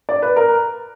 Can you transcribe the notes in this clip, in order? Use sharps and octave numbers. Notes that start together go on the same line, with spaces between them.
D5
B4
A#4